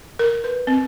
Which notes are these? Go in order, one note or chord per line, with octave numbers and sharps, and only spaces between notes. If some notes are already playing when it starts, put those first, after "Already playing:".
A#4
B4
C4